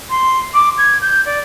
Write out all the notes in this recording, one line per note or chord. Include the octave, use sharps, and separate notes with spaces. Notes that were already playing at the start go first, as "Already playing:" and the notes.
C6
D6
G#6
G6
D5